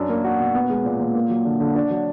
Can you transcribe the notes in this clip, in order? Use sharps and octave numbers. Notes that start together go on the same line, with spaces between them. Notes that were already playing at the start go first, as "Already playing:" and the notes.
Already playing: F#2 D4
A#3
F#4
B2
B3
G#3
A#2
A#2
A#3
F#3
D3
D3
D4
F#3